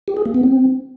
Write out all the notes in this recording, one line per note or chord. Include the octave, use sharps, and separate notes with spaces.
G4
G#4
A#3
B3
C4